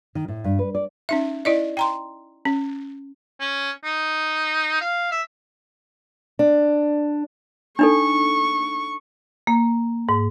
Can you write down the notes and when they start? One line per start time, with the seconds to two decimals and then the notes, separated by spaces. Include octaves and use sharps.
0.15 D#3
0.28 A2
0.44 G2
0.59 B4
0.75 D5
1.09 C#4 D#4 E5
1.45 E4 D5 D#5
1.77 G5 A#5 C6
2.45 C#4
3.40 C#4
3.84 D#4
4.81 F5
5.12 E5
6.39 D4
7.79 D4 D#4 A4 C#6
9.47 A#3
10.09 G#2